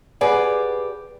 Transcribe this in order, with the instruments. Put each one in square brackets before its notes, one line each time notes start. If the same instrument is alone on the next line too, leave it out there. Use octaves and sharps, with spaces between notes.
[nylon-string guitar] G4 G#4 B4 D5 F#5